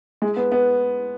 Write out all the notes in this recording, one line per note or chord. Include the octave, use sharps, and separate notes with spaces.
G#3
B3
B3